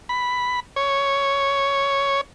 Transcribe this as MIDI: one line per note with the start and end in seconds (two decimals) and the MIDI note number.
0.09 0.60 83
0.76 2.21 73